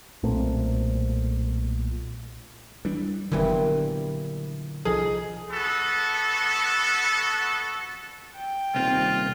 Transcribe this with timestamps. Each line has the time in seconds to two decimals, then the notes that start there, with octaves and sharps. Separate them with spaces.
0.23 B1 A#2 A3 C4
2.85 E3 G3 D4
3.32 G1 A#2 D3 E3 F#3 G3 B3
4.85 C2 F3 D#4 G#4 A4
5.50 B3 F#4 A4
8.35 G5
8.75 D#1 C2 C4 F4